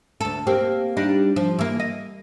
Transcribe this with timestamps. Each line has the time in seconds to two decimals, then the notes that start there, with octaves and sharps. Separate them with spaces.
0.21 D2 A4
0.47 A#3 C4 G4
0.97 G3 D4 D#4
1.36 F3
1.59 E3 A#3
1.80 D#5